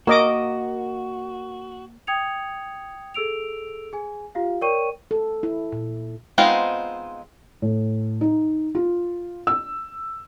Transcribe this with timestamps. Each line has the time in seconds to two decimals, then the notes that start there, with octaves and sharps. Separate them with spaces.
0.07 A#3 F#4 A#4 D#5 D6
2.07 G5 D#6 G#6 C#7 F7
3.14 G#4 A4 E6 D7 F7
3.93 G#4 G#5
4.35 F4 G4 F5
4.61 A#4 C#5 D5 G5 C#6 D#7
5.11 A4
5.43 E4
5.72 A#2
6.38 G#3 B3 C4 D#4 F4
7.62 A2
8.21 D#4
8.75 F4
9.47 E6